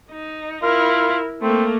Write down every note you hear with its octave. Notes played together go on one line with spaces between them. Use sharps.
D#4
E4 F4 A#4
A3 A#3 C4